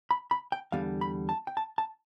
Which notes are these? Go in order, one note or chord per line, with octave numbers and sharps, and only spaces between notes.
B5
B5
G5
E2 D3 G3 B3 F5
B5
A5
G5
A5
A5